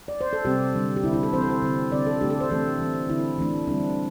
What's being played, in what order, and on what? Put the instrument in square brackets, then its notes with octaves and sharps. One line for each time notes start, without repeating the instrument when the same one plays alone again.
[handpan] D5
C5
A4
C3 G3 C4 G4
D3 G3 D4
G4
D3 E4
C4
E4
A4
E3 C4 C5
A4
C5
D3 C4
D3 C4 D5
A4
D3 A3 D4 G4
A4
C5
E3 A3 C4 A4
E3 C4
D3 C4 E4
E3 A3 D4
D3 G3 C4 D4